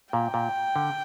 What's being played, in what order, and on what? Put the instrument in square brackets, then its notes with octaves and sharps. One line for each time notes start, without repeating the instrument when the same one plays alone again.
[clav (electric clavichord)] A#2 [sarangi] G5
[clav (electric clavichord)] A#2
D3